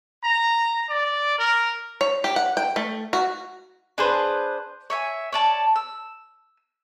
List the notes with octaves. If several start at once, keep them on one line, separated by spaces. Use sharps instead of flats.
A#5
D5
A#4
C#5
G4
F#5
G5
A3
F#4
D4 G#4 B4 C5
C#5 E5 G#5
C#5 D5 A5
E6